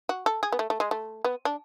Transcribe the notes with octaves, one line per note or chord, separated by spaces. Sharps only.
F#4
A4
G#4
B3
A3
A3
G#3
A3
B3
D4